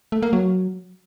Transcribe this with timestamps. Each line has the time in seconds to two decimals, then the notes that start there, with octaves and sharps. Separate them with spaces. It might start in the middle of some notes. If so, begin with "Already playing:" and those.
0.12 A3
0.22 A#3
0.33 F#3